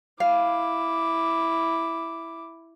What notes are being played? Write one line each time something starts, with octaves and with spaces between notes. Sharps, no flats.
E4 F5 D6